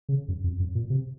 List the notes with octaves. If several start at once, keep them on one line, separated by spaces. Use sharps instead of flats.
C#3
F#2
F2
F#2
A#2
C3